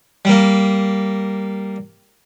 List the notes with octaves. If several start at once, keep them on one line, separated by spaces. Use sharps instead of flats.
G3 A#3